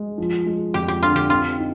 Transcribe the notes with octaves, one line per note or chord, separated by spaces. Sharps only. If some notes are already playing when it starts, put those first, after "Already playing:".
Already playing: G#3
F3
G#3
F2 G4
G4
D3 F4
G4
C4 F4
D#4